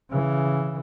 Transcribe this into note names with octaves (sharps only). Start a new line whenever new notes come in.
C#3 E3